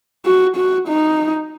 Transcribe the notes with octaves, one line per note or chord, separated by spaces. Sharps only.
F#4
F#4
D#4